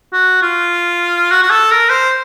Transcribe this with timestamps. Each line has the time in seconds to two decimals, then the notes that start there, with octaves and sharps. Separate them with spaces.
0.13 F#4
0.42 F4
1.31 F#4
1.42 F#4
1.50 A4
1.71 A#4
1.90 C5